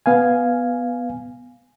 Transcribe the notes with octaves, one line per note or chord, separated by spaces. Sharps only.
B3 F5 G#5